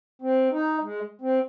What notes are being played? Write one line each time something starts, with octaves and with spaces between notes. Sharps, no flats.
C4
D#4
G#3
C4